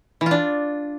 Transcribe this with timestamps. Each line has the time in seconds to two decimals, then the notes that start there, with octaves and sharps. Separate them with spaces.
0.21 E3
0.26 F4
0.31 D4